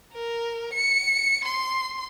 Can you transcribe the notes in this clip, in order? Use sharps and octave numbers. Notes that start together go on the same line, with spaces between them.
A#4
C#7
C6